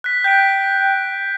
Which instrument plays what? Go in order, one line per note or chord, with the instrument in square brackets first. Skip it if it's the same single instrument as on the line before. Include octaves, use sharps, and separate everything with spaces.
[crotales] F#6 B6
[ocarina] G5 [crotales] G6 B6 D7